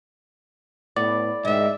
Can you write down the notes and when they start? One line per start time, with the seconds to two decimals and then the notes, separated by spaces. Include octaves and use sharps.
0.96 A2 B3 D5
1.45 G#2 D#3 G#3 E5